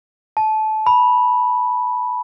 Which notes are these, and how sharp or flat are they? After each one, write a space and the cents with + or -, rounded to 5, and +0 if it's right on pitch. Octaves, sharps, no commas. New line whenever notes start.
A5 -20
B5 -10